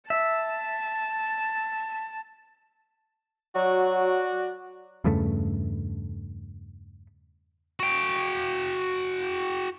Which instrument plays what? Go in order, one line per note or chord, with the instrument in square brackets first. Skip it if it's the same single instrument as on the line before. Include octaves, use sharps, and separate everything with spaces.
[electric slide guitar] E5 [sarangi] A5
[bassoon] F#3 [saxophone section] F#4 D5
[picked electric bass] E2 G2 C#3 A3
[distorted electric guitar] F#4 G5